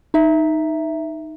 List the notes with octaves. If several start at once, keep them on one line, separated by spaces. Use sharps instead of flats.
D#4 E5